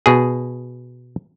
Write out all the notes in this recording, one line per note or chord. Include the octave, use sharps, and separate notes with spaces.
B2 G#4